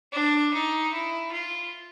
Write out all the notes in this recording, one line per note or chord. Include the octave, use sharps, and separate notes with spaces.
D4
D#4
E4
F4